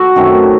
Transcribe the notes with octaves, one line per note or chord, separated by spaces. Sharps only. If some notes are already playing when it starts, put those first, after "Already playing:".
Already playing: F#4 A4
F#2 D#3 A3 C4